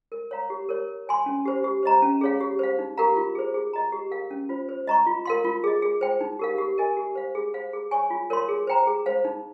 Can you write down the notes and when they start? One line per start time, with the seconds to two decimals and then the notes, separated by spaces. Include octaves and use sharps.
0.12 A#4
0.31 C#5 F5 A#5
0.50 G4
0.69 A#4 C#5
0.88 A#4
1.07 C#5 G#5 C6
1.26 C#4
1.46 G4 C5
1.64 G4
1.83 C5 D#5 A#5
2.02 C#4
2.21 G#4 C#5 F5
2.41 G4
2.59 C5 F5
2.79 D#4
2.97 G4 A#4 F5 A#5
3.16 F4
3.35 G#4 C5
3.54 G#4
3.73 D#5 A#5
3.92 G4
4.11 A#4 F5
4.31 C#4
4.49 F4 C5
4.69 C5
4.87 D#5 A#5 C#6
5.07 F4
5.25 A#4 F5 C6
5.44 F4
5.64 G#4 D#5
5.82 G#4
6.01 C5 G5
6.21 D#4
6.39 G4 A#4 F5
6.58 G4
6.78 A#4 D#5 G#5
6.97 G4
7.15 C5 F5
7.35 G#4
7.54 C5 F5
7.73 G#4
7.91 C#5 G#5 C#6
8.10 F4
8.30 A#4 C#5 F5 C6
8.49 G#4
8.67 C5 G5 A#5
8.87 G#4
9.06 C5 F5
9.25 D#4